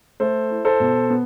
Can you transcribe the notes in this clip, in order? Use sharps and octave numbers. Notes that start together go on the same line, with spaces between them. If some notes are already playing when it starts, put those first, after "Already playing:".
A3 A4 C5
E4
A4 C5
B2
B3